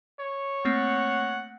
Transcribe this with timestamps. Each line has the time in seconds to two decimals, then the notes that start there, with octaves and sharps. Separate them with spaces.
0.20 C#5
0.65 A3 A#3 C4 F#5